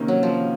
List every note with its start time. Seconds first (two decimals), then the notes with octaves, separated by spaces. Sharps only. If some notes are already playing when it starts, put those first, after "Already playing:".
Already playing: C3 D#3 A#3 C#4
0.08 F#3
0.23 F3